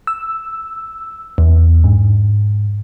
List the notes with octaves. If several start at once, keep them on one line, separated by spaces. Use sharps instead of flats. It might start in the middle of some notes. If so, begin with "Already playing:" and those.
E6
E2
G#2